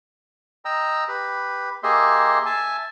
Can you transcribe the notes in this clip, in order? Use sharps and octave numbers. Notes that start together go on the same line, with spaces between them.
D#5 G5 A#5 E6
G4 B4 B5
A#3 G4 G#4 D#5 E5 C6
E5 G#5 A5